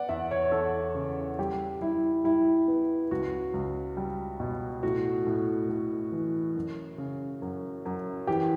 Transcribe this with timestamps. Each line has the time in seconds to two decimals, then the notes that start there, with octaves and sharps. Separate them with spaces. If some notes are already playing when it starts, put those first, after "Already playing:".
Already playing: B3 D5 F#5
0.09 E2 E5
0.31 C#5
0.52 E2 A4
0.95 C#3
1.39 G3 G4
1.81 G3 E4
2.24 G3 E4
2.68 B3
3.11 C#2 F#4
3.54 C#2
3.97 G3
4.40 B2
4.83 A2 F#4
5.27 A2
5.69 A2
6.12 E3
6.55 F#2
6.98 C#3
7.42 F#2
7.85 F#2
8.27 E3 G4